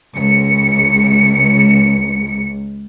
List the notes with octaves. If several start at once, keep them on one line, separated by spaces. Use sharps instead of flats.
C#2 C#7